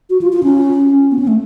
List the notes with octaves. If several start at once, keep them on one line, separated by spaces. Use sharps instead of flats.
F#4
F4
F4
C#4
B3
C#4
A3